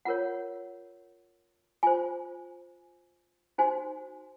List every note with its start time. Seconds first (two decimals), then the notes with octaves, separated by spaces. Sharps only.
0.05 F4 A#4 C#5 F#5
1.83 F4 C5 G#5
3.58 D#4 F#4 C5 G#5